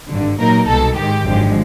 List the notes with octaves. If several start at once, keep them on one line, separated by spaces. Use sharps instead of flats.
G#1 G2 D3
A#2 F#3 A#3 D#4 A#4
C2 B2 G#3 A4
G#2 D#3 G#3 G4
G#1 F#2 D3 F3 G#3